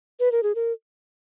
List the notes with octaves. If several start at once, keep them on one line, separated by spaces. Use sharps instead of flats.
B4
A#4
G#4
A#4